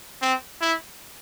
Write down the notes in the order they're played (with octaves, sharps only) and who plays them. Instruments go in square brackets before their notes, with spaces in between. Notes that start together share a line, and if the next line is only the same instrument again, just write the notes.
[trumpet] C4
E4